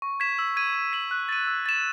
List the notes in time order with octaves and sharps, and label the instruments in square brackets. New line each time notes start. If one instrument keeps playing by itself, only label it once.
[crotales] C#6
G#6 B6 E7
E6
G#6 D#7
G#6
B6 D#7 F#7
F#6
A6 D#7
E6
A6 E7